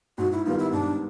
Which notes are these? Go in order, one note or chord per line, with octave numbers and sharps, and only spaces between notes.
G#2 F#4
E4
D#3 G3 B3 F4
E4
G#2 D4